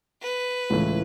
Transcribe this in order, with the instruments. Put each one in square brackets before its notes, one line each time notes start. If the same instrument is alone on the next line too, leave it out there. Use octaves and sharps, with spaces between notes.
[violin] B4
[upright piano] C#2 A2 E3